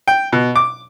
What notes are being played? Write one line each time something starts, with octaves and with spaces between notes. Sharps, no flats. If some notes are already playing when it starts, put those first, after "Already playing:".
G5
B2
D6